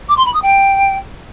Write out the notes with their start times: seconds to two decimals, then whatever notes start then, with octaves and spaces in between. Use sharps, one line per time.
0.09 D6
0.17 C6
0.25 B5
0.34 D#6
0.42 G5